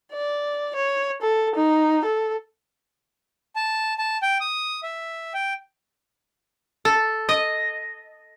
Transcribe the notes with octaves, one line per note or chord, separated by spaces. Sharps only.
D5
C#5
A4
D#4
A4
A5
A5
G5
D#6
E5
G5
A4
D#5